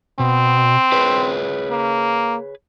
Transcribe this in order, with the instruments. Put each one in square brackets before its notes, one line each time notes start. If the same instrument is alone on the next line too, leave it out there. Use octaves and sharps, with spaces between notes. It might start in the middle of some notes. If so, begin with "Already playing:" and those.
[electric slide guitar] B2 [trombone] C4
[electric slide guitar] G#4 B4 C#5
[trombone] A#3